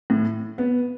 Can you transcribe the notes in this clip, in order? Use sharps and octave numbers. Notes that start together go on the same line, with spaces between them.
A2
B3